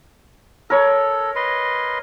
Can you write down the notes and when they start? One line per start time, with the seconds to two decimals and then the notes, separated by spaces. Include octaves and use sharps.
0.70 A4 A#4 C#5
1.36 B4 D#5 C6